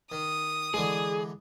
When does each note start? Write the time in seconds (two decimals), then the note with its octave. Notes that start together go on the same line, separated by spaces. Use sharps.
0.12 D#3 D#6
0.74 D3 E3 G#3 G#4